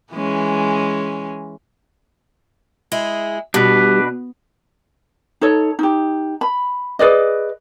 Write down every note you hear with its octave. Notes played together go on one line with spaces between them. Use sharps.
E3 G#3 C#4
G#3 E4 G#4
B2 G3 D4 B4
D#4 A4 C#5
D#4 G4
B5
G#4 B4 D5 D#5